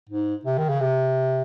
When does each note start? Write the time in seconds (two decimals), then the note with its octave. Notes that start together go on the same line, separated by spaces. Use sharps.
0.10 G#2
0.45 C3
0.58 D#3
0.69 C#3
0.80 C3